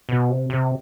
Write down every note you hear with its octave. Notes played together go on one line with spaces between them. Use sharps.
B2
C3
C3